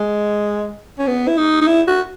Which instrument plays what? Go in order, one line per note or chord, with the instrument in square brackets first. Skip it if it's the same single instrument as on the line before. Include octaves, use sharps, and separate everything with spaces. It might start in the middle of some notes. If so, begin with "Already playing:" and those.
Already playing: [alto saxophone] G#3
C#4
B3
E4
D#4
D#4
E4
F#4